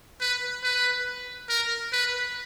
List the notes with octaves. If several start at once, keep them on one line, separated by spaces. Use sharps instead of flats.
B4
B4
A#4
B4